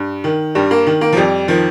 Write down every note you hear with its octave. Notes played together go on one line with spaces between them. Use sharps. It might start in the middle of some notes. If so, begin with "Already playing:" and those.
Already playing: G2
D#3
G2 G3
A#3
D#3
A#3
F3
F2 G3
D#3 F3